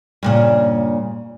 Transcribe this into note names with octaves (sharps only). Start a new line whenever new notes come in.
G2 A#2 C#3